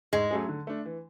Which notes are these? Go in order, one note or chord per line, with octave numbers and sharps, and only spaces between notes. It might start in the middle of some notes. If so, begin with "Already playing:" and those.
G#2 G#3
F#3 A3 C#4 G#4
D3
A3 D4
E3